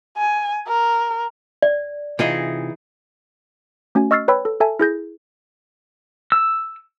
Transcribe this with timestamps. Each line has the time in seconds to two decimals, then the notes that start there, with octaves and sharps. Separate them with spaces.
0.17 G#5
0.68 A#4
1.62 D5
2.19 C3 E3 D#4 F4 G#4 D#5
3.95 A3 C#4 F#4 G#5
4.11 D#5 C#6 E6 F6 A6 C7
4.28 B4 C#5 G5 B5 E6
4.45 A4
4.60 A4 E5 G#5 A5
4.79 E4 G#4 G6 A#6
6.32 E6